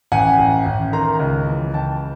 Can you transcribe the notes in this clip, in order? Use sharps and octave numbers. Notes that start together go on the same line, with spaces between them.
A1 F#5 G#5
A1
A1
D#3 A#5 C6
C#2
E3
C#2 G5 A5